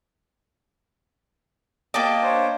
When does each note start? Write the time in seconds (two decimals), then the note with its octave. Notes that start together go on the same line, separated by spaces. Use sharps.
1.94 A#3 G4 D#5 A5 D6
2.22 D4 C5 C#5